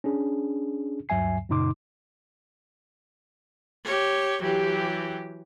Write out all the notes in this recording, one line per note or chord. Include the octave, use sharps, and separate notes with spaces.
C#4 D4 G#4
D2 G2 F#3 E5 G#5 C7
F#2 A#2 C#3 D#4 C6 D6
G4 C#5
E3 F#3 G4